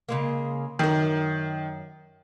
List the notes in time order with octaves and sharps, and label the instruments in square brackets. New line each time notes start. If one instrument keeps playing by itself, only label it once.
[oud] C#3 G#3 A#3
[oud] F#2 A#4 [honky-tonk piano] D#3